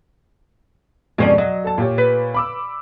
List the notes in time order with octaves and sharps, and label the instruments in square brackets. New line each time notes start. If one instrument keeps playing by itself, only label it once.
[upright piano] F2 G#2 B2 [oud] C#4 C5 D5
[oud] F#3 [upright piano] D#5
[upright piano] A4 A5
A#2 G4 C#5
[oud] B4
[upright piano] B5 D6 E6